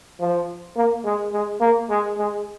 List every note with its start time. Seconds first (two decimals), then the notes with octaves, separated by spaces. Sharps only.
0.20 F3
0.77 A#3
1.05 G#3
1.33 G#3
1.61 A#3
1.90 G#3
2.18 G#3